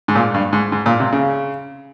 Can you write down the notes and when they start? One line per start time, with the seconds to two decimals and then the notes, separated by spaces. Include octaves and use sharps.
0.08 G#2
0.15 A#2
0.34 G2
0.53 G#2
0.72 G#2
0.86 A#2
1.00 C3
1.13 C#3